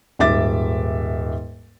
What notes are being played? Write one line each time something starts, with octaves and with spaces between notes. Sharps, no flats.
D#1 G#2 E5 D6 A6